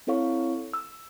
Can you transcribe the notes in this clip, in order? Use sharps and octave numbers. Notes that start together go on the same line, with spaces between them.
C4 E4 A4 C#5 F5 C#6
E6